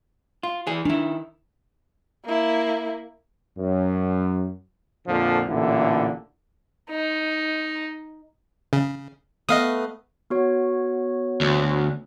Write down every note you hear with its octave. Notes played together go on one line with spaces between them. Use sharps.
F4
E3 G#4
D#3 D4 E4
A#3 E4
F#2
F2 A#2 D3 F3
A1 A#2 D3 E4
D#4
C#3
A3 B3 D#5 F5 D#6
B3 F#4 C#5
D2